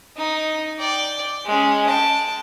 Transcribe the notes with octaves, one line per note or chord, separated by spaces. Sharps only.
D#4
D5 G5
G#3 C#4
G5 A5